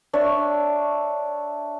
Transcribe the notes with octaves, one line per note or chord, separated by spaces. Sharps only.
D4 C#5 E5